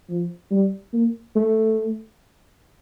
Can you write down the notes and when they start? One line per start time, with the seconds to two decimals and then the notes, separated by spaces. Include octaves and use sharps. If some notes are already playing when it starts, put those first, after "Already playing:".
0.09 F3
0.51 G3
0.93 A#3
1.36 A3